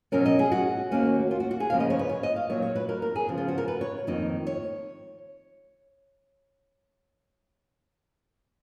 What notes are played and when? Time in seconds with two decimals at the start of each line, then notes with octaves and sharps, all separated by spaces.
0.12 B2 F#3 C#4 A#4
0.26 D#5
0.39 G#4
0.52 F#4
0.91 D#2 D#3 A#3 C#4
1.31 F4
1.40 F#4
1.51 F#4
1.60 G#4
1.70 D#2 C#3 F3 A#3 F5
1.80 D#5
1.90 C#5
1.99 B4
2.09 C#5
2.23 D#5
2.36 F5
2.49 A#2 F#3 A#3 D#4 C#5
2.62 C#5
2.75 B4
2.89 A#4
3.02 A#4
3.16 G#4
3.28 C#3 F3 B3
3.38 F4
3.48 F#4
3.58 A#4
3.68 B4
3.81 C#5
4.07 F2 D#3 A#3 D#4
4.47 C#5